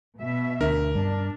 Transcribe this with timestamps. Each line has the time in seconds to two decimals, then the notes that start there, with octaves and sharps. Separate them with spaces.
0.20 B2 E5
0.61 D2 D3 D4 A#4
0.95 G2 D4